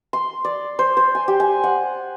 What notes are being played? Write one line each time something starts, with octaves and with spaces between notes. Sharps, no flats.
C6
D5
C5
C5
G#5
G4
G#5
F#5